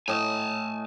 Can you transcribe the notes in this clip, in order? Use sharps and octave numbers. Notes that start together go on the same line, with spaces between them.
A2 D#5 G#5 A5